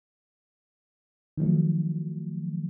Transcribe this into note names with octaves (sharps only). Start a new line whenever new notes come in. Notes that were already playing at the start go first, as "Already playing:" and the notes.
D#3 F3 F#3 A3